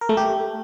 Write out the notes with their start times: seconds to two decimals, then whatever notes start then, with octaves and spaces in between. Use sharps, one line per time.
0.01 A#4
0.09 A3
0.17 G4